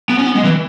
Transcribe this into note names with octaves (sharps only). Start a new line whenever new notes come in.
B3
C#4
B3
G#3
E3